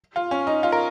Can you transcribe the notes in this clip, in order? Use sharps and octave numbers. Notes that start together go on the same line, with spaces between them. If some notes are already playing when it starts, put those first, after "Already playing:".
F4
C#4
D#4
F4
A#4